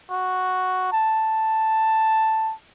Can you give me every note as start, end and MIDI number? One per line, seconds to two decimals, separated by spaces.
0.10 0.89 66
0.92 2.53 81